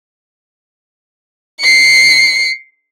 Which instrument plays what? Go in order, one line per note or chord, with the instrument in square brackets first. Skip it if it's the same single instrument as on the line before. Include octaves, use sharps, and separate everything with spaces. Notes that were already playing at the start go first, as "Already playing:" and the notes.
[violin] C7 C#7